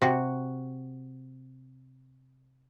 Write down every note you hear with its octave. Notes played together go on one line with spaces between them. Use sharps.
C3 F#4